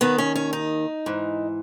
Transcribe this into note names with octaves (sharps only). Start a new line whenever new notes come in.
D#2 D#3 B3
C#4
C#4
D#4
G#2 E3